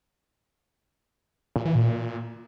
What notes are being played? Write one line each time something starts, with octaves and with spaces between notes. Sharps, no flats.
A#2
E3
A#2